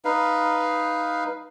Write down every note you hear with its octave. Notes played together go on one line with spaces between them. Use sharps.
D#4 B4 F5